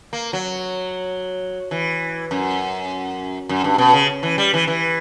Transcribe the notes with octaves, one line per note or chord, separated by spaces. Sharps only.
A#3
F#3
E3
F#2
F#2
G2
B2
C#3
E3
G3
E3
E3